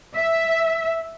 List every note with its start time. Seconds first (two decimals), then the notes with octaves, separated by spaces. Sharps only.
0.15 E5